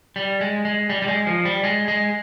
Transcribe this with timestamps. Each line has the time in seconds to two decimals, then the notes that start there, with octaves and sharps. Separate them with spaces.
0.16 G3
0.41 G#3
0.65 G#3
0.90 G3
1.02 G3
1.08 G#3
1.27 F3
1.45 G3
1.64 G#3
1.88 G#3